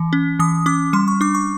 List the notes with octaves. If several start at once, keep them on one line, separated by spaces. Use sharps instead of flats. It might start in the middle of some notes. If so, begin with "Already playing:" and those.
Already playing: E3
C#4
E3 D#6
C#4 D6
G3 C6
C#6
D4 D6
C#6